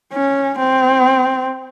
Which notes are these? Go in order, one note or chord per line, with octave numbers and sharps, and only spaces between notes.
C#4
C4